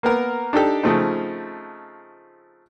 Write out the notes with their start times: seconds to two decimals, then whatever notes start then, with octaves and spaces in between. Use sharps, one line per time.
0.03 A#3 B3 A#4
0.53 D4 D#4 G4 A4
0.83 C#3 F3 A3 C4 D#4